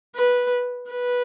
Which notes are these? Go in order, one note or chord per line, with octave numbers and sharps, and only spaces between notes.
B4
B4